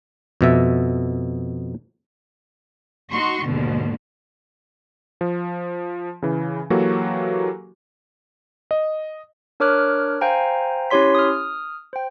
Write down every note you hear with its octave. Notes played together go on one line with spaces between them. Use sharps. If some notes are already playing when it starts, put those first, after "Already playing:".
F2 B2 E5
D#4 F#4 C6 C#6
D#2 G#2 B2 D3
F3
C#3 E3
E3 F#3 A#3 F#4 G4 A4
D#5
D4 A#4 C#5 D6 F6 F#6
C5 F5 G5 G#5 A#5
C#4 E4 G4 C#5 C6 B6
D#6 F6
C5 G5